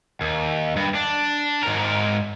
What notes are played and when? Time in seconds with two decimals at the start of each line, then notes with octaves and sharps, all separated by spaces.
0.21 D#2
0.76 G2
0.95 D4
1.63 G#2 A#4